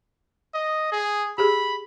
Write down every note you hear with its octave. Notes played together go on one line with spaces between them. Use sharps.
D#5
G#4
G4 G#4 B5